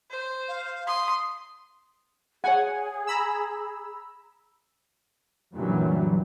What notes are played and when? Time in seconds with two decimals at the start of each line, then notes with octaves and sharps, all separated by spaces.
0.10 C5
0.48 F5
0.87 C6 D#6
2.44 G#4 C#5 F#5 G#5
3.07 A#5 B5 E6
5.54 F#2 A#2 D3 E3 F#3 G3